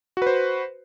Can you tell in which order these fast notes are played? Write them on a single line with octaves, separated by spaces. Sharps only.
F#4 B4 C5